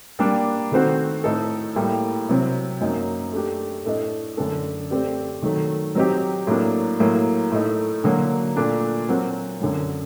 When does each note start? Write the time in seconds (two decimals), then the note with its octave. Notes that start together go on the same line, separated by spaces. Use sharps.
0.19 G3 A#3 D4
0.71 D#3 A3 C4 F#4 C5
1.24 A2 A3 D#4 A4
1.76 A2 G3 A#3
2.29 C3 F#3 C4
2.81 F#2 F#3 A#3 D#4
3.33 A3 D4 G4
3.85 A2 A3 D4 A4 D#5
4.37 F#2 D3 A3 D4 A4
4.90 A3 C4 G4 D5
5.42 D#3 F#3 A3
5.95 F#3 C4 D#4 G4
6.47 A2 F#3 A#3 D4
7.00 A2 F#3 A#3
7.51 A2 A3 D#4 A4
8.04 D3 F#3 A#3 F#4
8.56 A#2 A3 D4
9.09 F#3 C4 F#4 A#4
9.60 F#2 D3 F#3